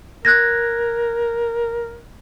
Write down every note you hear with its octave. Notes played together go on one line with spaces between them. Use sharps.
A#4 F#6 G#6 A#6